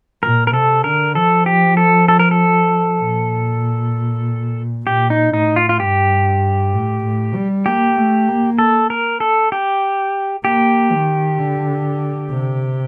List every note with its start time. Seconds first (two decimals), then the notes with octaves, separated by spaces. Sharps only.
0.22 A#2 A#4
0.47 A#4
0.53 C3 A4
0.84 D3 A#4
1.15 F3 A4
1.46 G4
1.77 A4
2.08 A4
2.19 A#4
2.31 A4
3.01 A#2
4.87 A#2 G4
5.10 D#4
5.33 A2 D#4
5.56 F4
5.69 F4
5.80 G2 G4
6.73 A2
7.05 A2
7.35 G3
7.66 A#3 G4
7.97 A3
8.28 A#3
8.59 A4
8.90 A#4
9.20 A4
9.52 G4
10.45 A#3 G4
10.91 D#3
11.38 D3
12.30 C3